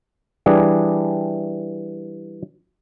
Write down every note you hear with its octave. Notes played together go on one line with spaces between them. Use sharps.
E3 G3 D4 G#4